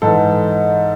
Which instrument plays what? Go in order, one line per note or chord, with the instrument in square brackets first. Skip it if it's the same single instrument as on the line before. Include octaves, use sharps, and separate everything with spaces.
[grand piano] G#2 E3 A4